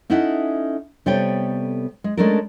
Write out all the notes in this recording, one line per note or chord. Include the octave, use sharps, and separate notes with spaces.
C#4 D#4 E4 A4 E5 F#5
C3 G3 B3 A4 C#5 G5
G#3
G#3 A3 C#4 D4 A4 A#4